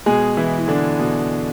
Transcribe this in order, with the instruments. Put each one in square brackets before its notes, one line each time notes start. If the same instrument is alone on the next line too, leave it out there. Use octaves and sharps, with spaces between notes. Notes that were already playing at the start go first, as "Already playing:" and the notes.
[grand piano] B2 G#3 G#4
E3 E4
E4
D3 D4
B2